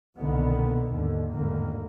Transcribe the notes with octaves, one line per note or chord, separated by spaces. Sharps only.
C2 B2 D3 D#3 A#3 B3
D#2 G#2 D3
G#1 E2 A2 D3 A#3